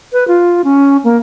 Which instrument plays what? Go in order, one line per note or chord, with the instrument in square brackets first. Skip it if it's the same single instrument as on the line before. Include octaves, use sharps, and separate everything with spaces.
[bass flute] B4
F4
C#4
A#3